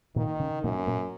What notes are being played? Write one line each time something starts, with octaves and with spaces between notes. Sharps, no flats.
A#2 D#3 A#3
C#3 C#4
F#2 A#2 A#3
C#4
A#2 A#3